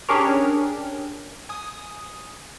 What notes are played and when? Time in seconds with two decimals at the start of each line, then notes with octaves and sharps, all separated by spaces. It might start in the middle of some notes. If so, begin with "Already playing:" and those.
0.09 C#4 D4 G4 G#4 A#4 C#5
1.49 G#5 D#6